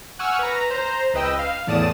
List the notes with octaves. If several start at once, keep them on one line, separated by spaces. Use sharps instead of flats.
F#5 G#5 C#6 E6 F6
B4 A#5
C5 A#5
C#2 B4 D#5 G5 E6
F5
E2 A2 D5 A5 D#6 E7